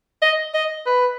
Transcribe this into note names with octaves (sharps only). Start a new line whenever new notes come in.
D#5
D#5
B4